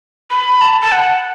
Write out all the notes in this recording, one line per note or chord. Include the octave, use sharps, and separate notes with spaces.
B5
A5
A5
F#5